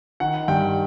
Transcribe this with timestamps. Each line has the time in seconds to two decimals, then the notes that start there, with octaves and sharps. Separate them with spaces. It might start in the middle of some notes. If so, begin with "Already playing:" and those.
0.20 D#3 F#5
0.48 G2 G5